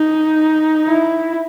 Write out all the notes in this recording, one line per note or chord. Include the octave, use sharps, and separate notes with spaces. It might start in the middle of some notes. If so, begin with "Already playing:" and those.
Already playing: D#4
E4